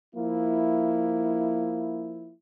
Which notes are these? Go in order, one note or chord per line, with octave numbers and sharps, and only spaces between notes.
F3 A#3 E4